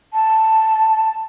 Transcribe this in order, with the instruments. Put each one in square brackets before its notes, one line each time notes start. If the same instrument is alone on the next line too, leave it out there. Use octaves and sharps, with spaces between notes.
[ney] A5